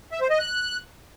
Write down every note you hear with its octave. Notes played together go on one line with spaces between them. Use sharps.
E5
C5
D#5
F#6